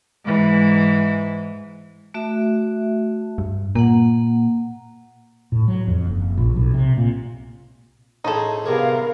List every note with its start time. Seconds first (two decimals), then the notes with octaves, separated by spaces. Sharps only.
0.25 G#2 E3
2.14 A3 F#4 E5
3.38 G2
3.75 A#2 A#3 F#5
5.52 A2
5.68 F#3
5.87 F2
6.07 F#1
6.38 A#1
6.56 B1
6.74 C3
6.97 A#2
8.24 A2 C4 D#4 G#4 A4
8.66 G2 C3 B3 G#4 A#4 F5